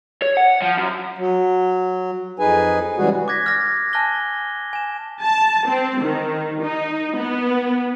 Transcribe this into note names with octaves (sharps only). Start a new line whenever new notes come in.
C#5
F#5
F3
F#2
F#3
F2 D#4 G#4 B4 G#5
C#3 E3 G3 G#3 F#4 G#4
D6 F#6 G#6 A#6 B6
F6 A6 A#6
G#5 A5 F6 F#6 A#6 G7
G#5 E7
A5
C4
D#3
D#4
B3